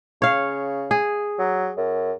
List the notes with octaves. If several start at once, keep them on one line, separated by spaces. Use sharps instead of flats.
C#3 C#5 F5
G#4
F#3
F#2